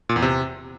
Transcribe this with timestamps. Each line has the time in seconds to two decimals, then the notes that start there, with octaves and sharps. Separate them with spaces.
0.09 A#2
0.16 E2
0.22 C3